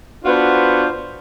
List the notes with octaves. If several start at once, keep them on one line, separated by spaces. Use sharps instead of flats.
B3 D4 F4 F#4 B4 C5